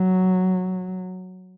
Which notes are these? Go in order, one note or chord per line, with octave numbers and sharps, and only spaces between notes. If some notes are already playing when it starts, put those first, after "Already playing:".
Already playing: F#3